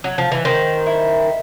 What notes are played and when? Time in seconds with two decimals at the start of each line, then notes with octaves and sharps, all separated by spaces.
0.04 F#3
0.18 F3
0.32 E3
0.45 D#3 C5
0.87 E4